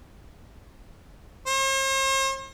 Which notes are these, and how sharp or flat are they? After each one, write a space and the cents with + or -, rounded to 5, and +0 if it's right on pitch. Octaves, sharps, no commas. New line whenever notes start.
C5 +45